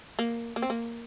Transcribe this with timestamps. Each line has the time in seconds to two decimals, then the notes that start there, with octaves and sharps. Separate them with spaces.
0.19 A#3
0.56 A#3
0.62 C4
0.70 A#3